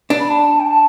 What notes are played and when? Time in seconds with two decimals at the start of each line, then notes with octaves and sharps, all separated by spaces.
0.10 D4
0.20 B5
0.29 A5
0.60 G5
0.66 A5